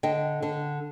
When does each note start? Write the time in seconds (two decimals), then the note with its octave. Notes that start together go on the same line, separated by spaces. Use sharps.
0.03 D3 D#5 G5
0.42 D3